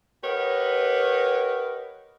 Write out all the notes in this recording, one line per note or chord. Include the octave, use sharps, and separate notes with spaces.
G4 A#4 B4 C#5 D#5 F#5